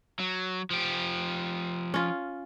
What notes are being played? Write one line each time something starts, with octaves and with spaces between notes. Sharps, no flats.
F#3
F3 G4
C#4 F4